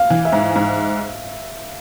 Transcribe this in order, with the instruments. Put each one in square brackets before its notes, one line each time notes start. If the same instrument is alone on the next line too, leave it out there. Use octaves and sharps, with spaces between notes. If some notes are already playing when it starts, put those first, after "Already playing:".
Already playing: [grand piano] F5
[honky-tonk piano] E3
[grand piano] E5
[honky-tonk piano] G#2
G#2